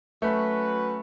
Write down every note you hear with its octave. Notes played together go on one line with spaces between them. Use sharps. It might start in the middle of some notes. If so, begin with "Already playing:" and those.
F#3 A3 C#4 F#4 B4